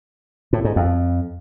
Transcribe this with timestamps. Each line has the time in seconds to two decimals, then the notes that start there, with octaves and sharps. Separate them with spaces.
0.53 A2
0.64 G#2
0.76 F2